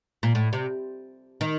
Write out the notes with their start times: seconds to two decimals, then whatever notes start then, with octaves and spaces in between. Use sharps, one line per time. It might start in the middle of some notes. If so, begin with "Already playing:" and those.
0.23 A#2
0.35 A2
0.53 C3
1.41 D#3